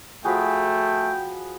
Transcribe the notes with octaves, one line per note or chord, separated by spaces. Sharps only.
F3 A3 F#4 G#4 G5 G#5 B5 B6